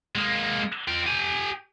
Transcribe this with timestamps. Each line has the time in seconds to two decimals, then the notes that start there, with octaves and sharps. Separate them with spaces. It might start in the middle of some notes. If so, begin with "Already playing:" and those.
0.15 G#3 A#3
0.88 F4 G5
1.06 G4 G#5